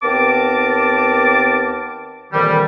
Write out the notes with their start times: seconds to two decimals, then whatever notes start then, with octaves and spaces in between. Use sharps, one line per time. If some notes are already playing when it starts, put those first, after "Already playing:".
0.03 D#2 B3 C4 A#4 A5 D6
2.33 F2 A#2 D#3 E3 G3